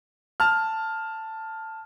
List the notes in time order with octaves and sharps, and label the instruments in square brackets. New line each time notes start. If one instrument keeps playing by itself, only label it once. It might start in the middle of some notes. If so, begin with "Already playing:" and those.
[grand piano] A5 F6